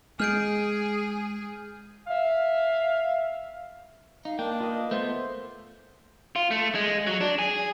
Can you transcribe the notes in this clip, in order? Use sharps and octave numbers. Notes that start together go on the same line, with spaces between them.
G#3 G#4 F6 G6 D7
E5 F5
D#4 F5
A#3 D4 A#4 G5
F4 B4 D#5
A3 B3 C5
F4
A3
G#3
F#3
D4
G#4